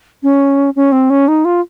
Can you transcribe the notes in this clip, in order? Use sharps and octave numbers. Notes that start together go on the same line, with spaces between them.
C#4
C#4
C4
C#4
D#4
F4